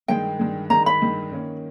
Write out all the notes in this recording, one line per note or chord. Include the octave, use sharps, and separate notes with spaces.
G2 D#3 G#3 G5
G2 D#3 G#3
G2 D#3 G#3 A#5
B5
G2 D#3 G#3
D#3 A#3 C#4